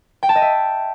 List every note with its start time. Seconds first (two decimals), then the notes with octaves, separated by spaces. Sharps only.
0.23 G5
0.29 A5
0.35 D#5
0.42 E5